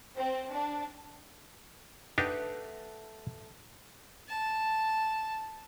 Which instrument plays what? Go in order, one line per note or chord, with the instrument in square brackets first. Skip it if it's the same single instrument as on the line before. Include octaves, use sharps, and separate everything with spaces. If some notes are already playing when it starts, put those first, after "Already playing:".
[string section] C4
D4
[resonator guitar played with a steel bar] A3 B4 F#5 [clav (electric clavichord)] D4 D#4 G4
[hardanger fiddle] A5